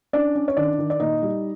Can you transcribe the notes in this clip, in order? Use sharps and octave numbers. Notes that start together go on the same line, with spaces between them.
C#4 D4 D5
C#4
C#5
D#3 D4 D5
D#3
D5
A#2 D#4 D#5
G3